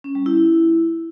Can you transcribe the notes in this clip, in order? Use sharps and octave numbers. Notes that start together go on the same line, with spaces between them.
C#4
G3
E4